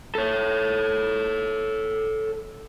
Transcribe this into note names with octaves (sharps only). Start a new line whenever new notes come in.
A4 C#5